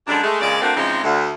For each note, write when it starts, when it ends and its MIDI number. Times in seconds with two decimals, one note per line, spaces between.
0.07 0.21 42
0.07 0.21 50
0.07 0.21 55
0.07 0.21 56
0.07 0.21 62
0.22 0.39 56
0.22 0.39 57
0.41 0.61 41
0.41 0.61 46
0.41 0.61 49
0.41 0.61 56
0.41 0.61 74
0.61 0.74 57
0.61 0.74 58
0.61 0.74 60
0.61 0.74 62
0.61 0.74 66
0.75 1.01 49
0.75 1.01 52
0.75 1.01 53
0.75 1.01 56
0.75 1.01 60
0.75 1.01 63
1.03 1.29 38